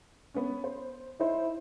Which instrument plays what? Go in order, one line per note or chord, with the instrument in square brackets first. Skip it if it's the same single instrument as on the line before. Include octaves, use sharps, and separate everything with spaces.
[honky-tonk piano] B3 C#4
C5
[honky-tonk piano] D#4 C5 [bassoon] E4